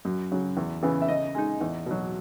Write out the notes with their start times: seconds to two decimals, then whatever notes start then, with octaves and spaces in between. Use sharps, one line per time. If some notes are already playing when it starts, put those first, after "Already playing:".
0.05 F#2
0.32 C#3 F#3
0.57 E2
0.83 C#3 E3 B3
1.02 E5
1.08 C#3 D#5
1.35 G#3 D#4
1.61 E2
1.86 B2 F#3